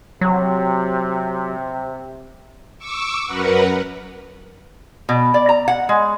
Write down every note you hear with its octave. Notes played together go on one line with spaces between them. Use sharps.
C3 F#3
C#6 D6 E6
F#2 A#4 B4 F#5
B2
D5
A#5
F#5
G#3